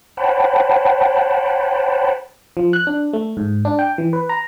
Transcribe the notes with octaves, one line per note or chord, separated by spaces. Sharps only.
C5 C#5 F#5 G5 A5 B5
F3
F#6
D4
A3
G#2
D4
G5
E3
B4
A#5